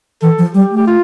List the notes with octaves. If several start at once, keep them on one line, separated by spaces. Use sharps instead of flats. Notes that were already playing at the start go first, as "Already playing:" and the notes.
E3 A4
F3
G3 G4
A3
G4
F4